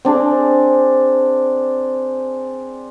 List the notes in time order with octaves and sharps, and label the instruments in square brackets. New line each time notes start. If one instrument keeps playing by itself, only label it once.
[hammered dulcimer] C4 D4 G#4